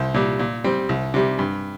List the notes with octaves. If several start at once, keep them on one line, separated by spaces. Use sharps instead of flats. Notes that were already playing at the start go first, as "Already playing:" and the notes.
Already playing: C2 C5
A#2 G3
A#2
G3 C4
C2
C3 G3
G2